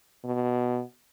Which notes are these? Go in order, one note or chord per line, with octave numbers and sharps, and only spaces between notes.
B2